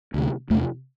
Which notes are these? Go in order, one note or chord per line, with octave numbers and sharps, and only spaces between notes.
D2 C3
E2 C3 A3